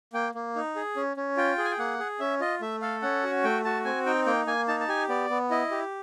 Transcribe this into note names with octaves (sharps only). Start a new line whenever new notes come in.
A#3 G5
A#3
D#4
G#4
C#4
C#4
F4 G5
G#4
G#5
G5
A#3 F#5
G#4
C#4 E5
F4 D#5
A3 E5
A4 F5
C#4 F#5
F#4
A3 G5
F#4 A5
C4 G#5
D#4 G5
A#3 G5
A#3 G#5
D#4 A5
A5
G4 G#5
B3 D5
B3
E4 D#5
G4